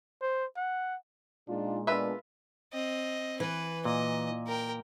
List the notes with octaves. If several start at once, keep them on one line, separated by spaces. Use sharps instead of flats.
C5
F#5
A#2 G#3 D4 D#4 F4
B3 D4 F4 B4 E5
C4 D#5
E3 B4
A#2 D#5
A#4 G5